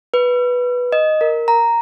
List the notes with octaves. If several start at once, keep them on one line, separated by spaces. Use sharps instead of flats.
B4
D#5
A#4
A#5